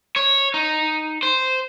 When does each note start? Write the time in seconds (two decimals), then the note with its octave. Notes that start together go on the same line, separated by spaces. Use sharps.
0.16 C#5
0.54 D#4
1.23 C5